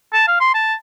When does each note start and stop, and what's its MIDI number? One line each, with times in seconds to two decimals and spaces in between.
0.13 0.25 81
0.28 0.40 77
0.40 0.53 84
0.54 0.74 81